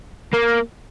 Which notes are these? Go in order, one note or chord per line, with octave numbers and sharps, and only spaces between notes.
A#3